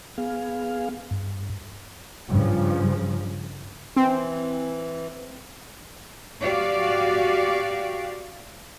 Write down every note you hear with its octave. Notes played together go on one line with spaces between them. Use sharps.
B3 G#4 F5
G2
G2 C#3 F3
E3 C4
F#4 G4 D5 F5